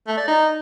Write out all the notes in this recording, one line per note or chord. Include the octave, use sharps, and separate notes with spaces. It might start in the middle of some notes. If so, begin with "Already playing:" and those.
A3
D5
D#4